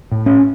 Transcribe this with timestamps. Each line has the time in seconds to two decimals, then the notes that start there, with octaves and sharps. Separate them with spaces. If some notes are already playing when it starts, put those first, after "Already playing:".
0.11 A2
0.26 C#4